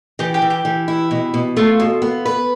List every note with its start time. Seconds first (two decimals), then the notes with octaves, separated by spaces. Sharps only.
0.19 E3 G4
0.34 G4
0.42 E3
0.50 G4
0.65 E3
0.88 E4
1.11 B2
1.34 B2
1.57 A3 F4
1.80 B2
2.02 B3
2.26 B4